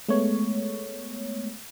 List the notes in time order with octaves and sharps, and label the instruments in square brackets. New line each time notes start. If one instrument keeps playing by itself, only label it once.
[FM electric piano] G#3 A3 B3 C#5